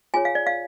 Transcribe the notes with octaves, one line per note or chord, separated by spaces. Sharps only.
F4 G#4 C#5 G#5
F5
D5
F5